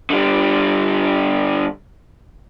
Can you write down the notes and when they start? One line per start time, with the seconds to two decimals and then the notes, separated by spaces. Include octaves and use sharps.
0.10 D3 G3